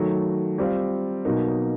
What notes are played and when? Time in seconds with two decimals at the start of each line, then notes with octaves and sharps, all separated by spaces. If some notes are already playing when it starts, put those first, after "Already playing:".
Already playing: D#3 F#3 A3
0.58 G3 C4 F4
1.25 B2 F#3 A#3 D#4